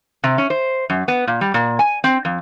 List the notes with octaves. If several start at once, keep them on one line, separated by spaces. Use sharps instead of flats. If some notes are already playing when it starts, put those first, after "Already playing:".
C3
C#4
C5
F#2
B3
A#2
G3
A#2
G#5
C4
F2